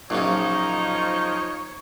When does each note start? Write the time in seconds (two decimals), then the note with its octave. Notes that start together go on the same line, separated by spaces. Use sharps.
0.10 A#1 F#2 C#3 F3 D#4 C#5